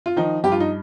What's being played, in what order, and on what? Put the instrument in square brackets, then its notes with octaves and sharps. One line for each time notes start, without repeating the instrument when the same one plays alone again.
[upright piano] F4
D#3 F3 D#4
G2 G4
F4
D#4